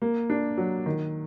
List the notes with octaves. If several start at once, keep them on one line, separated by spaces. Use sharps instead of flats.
A#3
D4
F#3
D#3